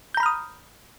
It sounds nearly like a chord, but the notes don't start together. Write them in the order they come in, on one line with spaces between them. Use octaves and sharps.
G6 A#5 B5 F6 D#6